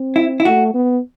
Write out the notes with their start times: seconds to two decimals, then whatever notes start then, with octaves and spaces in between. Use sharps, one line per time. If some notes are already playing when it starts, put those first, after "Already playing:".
Already playing: C4
0.16 E4
0.40 E4
0.45 A3 F#4
0.74 B3